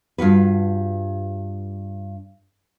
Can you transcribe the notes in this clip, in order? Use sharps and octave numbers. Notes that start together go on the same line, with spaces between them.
G2 F4 F#4 B4